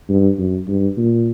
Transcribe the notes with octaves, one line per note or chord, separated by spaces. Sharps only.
G2
F#2
G2
A#2